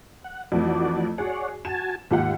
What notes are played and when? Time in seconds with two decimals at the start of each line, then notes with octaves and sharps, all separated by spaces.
0.24 F#5
0.52 F2 E3 A3 F#4 D5
1.18 F#4 G#4 C#5 D5 F#5
1.65 F#4 G#5 A5 E7
2.11 D#2 G#2 F4 G4 F#5